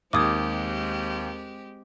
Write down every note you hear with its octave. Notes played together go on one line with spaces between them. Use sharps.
D#2 G#3 C4 G4 D6 D#6 G#6